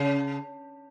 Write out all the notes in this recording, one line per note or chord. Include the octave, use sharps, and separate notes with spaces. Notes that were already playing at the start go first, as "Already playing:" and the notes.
Already playing: C#3